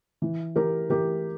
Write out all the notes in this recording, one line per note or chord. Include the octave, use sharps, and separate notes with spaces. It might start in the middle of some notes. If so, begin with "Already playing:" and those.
E3
E3 G4 A#4
E3 G4 A#4